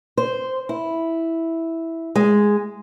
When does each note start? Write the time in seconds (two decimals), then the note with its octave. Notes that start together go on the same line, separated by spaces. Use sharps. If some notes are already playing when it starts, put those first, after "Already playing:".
0.17 C5
0.69 E4
2.15 G#3